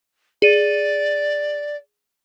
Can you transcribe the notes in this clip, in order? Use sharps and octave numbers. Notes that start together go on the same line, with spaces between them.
G#4 D5 D#7